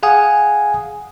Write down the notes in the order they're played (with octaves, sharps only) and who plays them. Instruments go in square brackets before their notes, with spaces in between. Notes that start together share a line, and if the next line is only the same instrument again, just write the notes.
[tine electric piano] G#4 F5 F#5 G#5 D#6